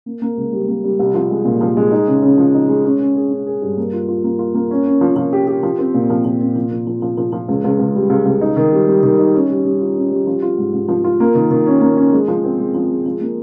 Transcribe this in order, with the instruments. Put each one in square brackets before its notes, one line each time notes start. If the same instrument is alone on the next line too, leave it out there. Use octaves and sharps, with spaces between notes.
[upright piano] A#3
A#3
C#2
G3
A#3
G3
C2
F3
G#3
A#2
F3
G#3
D#4
C#3
C#3
F3
D#4
G#3
C#4
C#4
G#4
C#4
G#4
G2
A#3
F4
F4
A#3
F4
A#3
C#4
C#4
F3
F3
G4
G4
F3
C4
A#2
F3
F3
A#2
F3
F3
F3
F3
F3
F3
C#2
C#2
C#2
G3
C#2
C#2
D#4
D#3
G3
G3
D#3
D#4
C#4
G3
G3
F4
C#4
G3
F3
F4
G#2
G#2
F3
F4
A#3
D#3
D#3
C#4
A#3
C#4
G#3
F3
C4
G#3
F3
G#3
F3
A#3